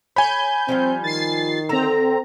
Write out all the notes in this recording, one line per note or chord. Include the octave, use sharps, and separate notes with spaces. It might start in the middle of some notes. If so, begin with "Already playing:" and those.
C#5 G#5 B5 G6
F3 G3 C4 F4
D#3 A6 C7
D3 C4 A4 A#5